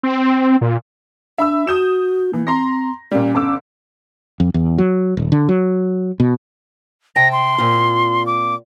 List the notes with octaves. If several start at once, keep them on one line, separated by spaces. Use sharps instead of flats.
C4
A#2
D4 E5 B5 E6
F#4 D#6 G6 E7
E3 A#3
C4 A#5 C6 A#6
A#2 G3 C#4
G1 D6 E6
F2
E2
F#3
D#1
D3
F#3
B2
C3 G5 A5 A#6
C6
A#2 C4 F4
D6